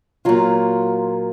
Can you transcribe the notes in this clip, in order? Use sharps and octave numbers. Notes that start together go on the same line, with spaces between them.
A#2 F#3 F4